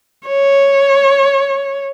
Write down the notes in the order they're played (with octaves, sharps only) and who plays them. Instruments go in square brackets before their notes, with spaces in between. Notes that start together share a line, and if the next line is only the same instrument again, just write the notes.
[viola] C#5